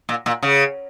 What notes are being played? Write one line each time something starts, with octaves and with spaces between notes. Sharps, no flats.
A#2
A#2
C#3